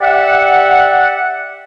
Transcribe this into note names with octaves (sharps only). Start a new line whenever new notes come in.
G4 D5 E5 F#5